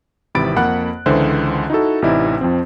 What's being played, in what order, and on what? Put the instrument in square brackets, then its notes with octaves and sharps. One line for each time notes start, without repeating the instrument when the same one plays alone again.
[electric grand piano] G#1 C3 E3 B5 A6 D7
F2 A#3 F#5 B5 F#6
C#2 D3 E3 C5 E5
D#4 E4 F#4 A4
A1 C3 E3 D#4 E4 D5
F2 F3 C4